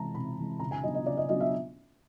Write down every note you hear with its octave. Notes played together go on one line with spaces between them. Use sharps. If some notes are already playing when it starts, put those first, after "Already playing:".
Already playing: C3 E3 G#3 A5 A#5
C3 B5
E3 G#3
C#3 A#5
G#5
F#3 B3 D4 D#5
D#5
C#3 D5
D#5
F#3 B3 D4 D#5
E5